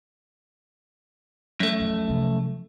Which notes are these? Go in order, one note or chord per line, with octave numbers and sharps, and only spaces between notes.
F#2 A3
F2
C3 F3